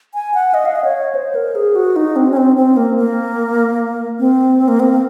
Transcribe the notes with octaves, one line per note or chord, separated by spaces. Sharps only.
G#5
F#5
D#5
F5
D#5
C#5
C5
A#4
G#4
F#4
D#4
C4
C#4
C4
C4
A#3
A#3
C4
A#3
C4